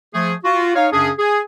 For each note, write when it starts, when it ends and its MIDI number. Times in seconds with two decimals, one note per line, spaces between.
0.14 0.33 53
0.14 0.33 57
0.14 0.33 68
0.44 0.74 65
0.44 0.74 66
0.75 0.88 63
0.75 0.88 73
0.75 0.88 77
0.92 1.10 42
0.92 1.10 49
0.92 1.10 61
0.92 1.10 62
0.92 1.10 68
1.19 1.41 68